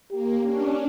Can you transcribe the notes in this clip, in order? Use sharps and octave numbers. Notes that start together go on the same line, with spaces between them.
A#3 G4
C#4 D4